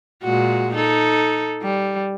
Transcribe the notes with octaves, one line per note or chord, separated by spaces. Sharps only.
A#2 G#3 F#4
D#4 A4
G3